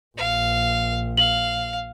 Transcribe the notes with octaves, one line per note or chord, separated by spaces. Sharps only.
A#1 F5
F5 F#7